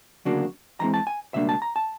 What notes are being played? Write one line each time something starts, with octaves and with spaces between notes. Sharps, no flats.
D2 C#3 F#3 A#3 D4
D#2 C#3 E3 G#3 C4 A#5
A5
G#5
C#2 B2 G3 A#3 D4 E5
A5
A#5
A5